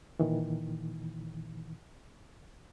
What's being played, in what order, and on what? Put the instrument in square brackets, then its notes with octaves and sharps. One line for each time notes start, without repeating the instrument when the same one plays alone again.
[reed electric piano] A#2 D#3 E3